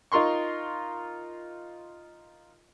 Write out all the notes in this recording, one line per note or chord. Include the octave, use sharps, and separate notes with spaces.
D#4 F4 A#4 C6 C#6